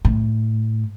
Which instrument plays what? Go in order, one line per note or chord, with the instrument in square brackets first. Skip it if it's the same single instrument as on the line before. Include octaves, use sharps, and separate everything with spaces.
[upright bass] A2